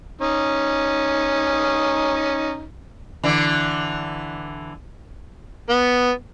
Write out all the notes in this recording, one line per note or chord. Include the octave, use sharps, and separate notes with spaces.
C#4 D#4
D3 E3
B3